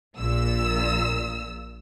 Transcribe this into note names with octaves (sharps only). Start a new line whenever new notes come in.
A#1 A#2 E6